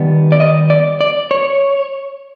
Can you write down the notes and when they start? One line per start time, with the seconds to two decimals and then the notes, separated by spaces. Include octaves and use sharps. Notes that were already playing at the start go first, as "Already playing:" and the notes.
Already playing: D#3 G3 B3
0.32 D5
0.40 D#5
0.70 D5
1.01 D5
1.31 C#5